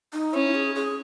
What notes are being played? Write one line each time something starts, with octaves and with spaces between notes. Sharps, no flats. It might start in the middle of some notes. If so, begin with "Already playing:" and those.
D#4
C#4 E4
G#4
G#4